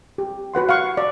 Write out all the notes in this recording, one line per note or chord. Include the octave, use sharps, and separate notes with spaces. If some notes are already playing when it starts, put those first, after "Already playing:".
G4
F#4 B4 F#5 C6
F5 F#5 C#6
D5